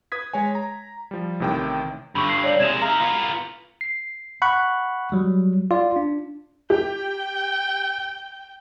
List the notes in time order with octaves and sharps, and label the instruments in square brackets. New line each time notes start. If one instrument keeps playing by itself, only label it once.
[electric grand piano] B4 D#6 G#6 B6
G#3 C#5 G#5
A#5
F3 G3
A1 A2 C3 D#3 G5
[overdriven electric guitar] G2 D3 [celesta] B5 C#6
[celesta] C7
C#5 D5 F#7
[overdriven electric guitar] C3 G#3 [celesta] G#6 E7 F7
[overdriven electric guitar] D#4 F5 [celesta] A#5
[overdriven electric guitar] B3 F4
[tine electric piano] C7
F#5 B5 C#6 F#6
F#3 G3
F4 D5
D4
[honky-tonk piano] G4 [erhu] G5